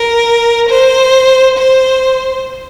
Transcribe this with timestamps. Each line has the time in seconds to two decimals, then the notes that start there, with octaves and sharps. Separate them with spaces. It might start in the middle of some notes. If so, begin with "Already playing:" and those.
Already playing: A#4
0.69 C5
1.57 C5